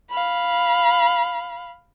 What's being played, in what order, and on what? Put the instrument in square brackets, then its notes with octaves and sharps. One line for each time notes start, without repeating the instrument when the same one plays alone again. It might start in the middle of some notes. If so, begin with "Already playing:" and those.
[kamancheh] F5 B5